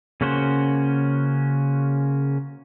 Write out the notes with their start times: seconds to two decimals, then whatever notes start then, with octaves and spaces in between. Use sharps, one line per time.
0.21 C#3 A#3 C#4 F#4 C5